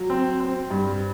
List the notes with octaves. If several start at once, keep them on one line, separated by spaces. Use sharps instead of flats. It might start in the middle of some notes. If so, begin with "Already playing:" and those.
Already playing: F#3
C4
C4
G2